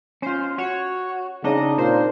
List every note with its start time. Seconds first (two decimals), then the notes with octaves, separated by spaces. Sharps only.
0.22 C#4 F4 C5
0.58 F#4 C#5
1.44 C#3 C4 D4 D#4 D#5
1.78 A#2 C5